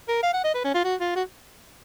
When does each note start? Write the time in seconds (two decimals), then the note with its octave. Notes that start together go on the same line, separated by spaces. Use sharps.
0.08 A#4
0.23 F5
0.33 F#5
0.44 D#5
0.54 B4
0.64 C#4
0.74 F4
0.84 F#4
1.00 F4
1.15 F#4